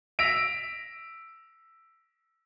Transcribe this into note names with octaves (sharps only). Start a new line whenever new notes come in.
E6 A#6 B6 D7 F7